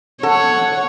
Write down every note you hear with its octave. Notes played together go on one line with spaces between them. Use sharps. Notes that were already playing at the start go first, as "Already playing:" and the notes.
A4 C#5 F#5